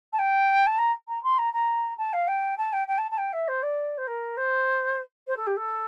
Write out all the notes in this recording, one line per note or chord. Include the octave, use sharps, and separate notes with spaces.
A5
G5
A5
A#5
A#5
C6
A#5
A#5
A5
F5
G5
A5
G5
G5
A5
A5
G5
E5
C5
D5
C5
A#4
C5
C5
A4
G4
A4